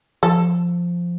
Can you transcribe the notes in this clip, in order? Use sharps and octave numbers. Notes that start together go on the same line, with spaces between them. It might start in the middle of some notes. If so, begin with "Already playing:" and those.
F3 A4